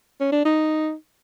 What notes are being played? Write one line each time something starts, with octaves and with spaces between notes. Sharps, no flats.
C#4
D4
D#4